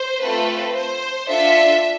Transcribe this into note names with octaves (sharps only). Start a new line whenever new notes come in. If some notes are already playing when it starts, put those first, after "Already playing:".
Already playing: C5
A3 C4 F4 A4 B4
C5
D4 F4 A4 E5